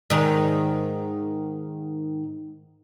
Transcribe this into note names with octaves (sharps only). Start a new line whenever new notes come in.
G#2 D#3